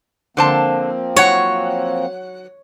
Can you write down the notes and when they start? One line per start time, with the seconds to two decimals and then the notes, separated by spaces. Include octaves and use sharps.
0.37 D3 F3 A#3 C4 C5 A5
1.16 F#3 C#5 F#5